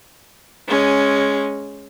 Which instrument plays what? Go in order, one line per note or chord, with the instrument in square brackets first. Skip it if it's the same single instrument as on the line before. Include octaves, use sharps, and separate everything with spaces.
[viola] G#3 C#4